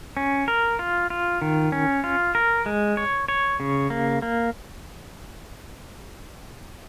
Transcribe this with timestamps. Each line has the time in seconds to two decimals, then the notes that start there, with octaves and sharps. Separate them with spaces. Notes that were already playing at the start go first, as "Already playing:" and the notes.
0.17 C#4
0.48 A#4
0.79 F4
1.10 F4
1.42 D#3
1.72 C#4
2.04 F4
2.35 A#4
2.66 G#3
2.97 C#5
3.28 C#5
3.60 C#3
3.90 A#3
4.22 A#3